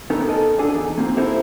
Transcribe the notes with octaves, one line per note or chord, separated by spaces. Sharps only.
B3 C#4 D#4 A4 A#4
A4 A#4 D#5
C#4 D4 G#4 A4 F#5
E2 D#4
A#3 C4 F4
D#4 E4 G4 A4 A#4 C5